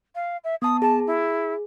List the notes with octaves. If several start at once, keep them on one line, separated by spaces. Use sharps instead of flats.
F5
E5
B3 A5 D#6
G#4 A5
E4